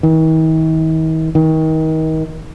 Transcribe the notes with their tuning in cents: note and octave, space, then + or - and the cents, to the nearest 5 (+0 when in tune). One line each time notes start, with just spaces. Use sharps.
D#3 +45
D#3 +30